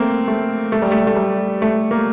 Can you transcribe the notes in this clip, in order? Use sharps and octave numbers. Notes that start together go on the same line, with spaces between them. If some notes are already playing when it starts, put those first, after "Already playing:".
Already playing: A3 A#3 C4
A3
A3
G3
A3
A3
G3
A3
A#3